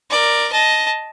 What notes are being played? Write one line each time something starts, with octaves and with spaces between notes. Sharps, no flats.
A#4 D5
D#5 A5